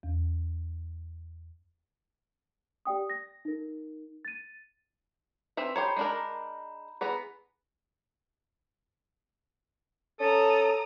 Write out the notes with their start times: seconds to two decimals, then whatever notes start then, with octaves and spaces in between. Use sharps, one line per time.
0.03 E2
2.86 G4 D5 G5 D#6
3.10 A#6
3.45 D#4 A#4
4.25 A6 D#7
5.57 E3 C4 E5
5.76 G4 C5 C#5 A#5 B5 G6
5.96 G#3 D4 A#4
7.01 E3 B3 G#4 A#5 B5
10.20 C#4 A4 A5 A#5 D#6